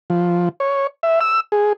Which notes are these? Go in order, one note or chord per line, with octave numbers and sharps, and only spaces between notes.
F3
C#5
E5
E6
G#4